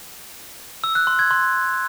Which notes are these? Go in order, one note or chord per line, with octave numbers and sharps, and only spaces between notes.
E6
F#6
C6
G#6
C6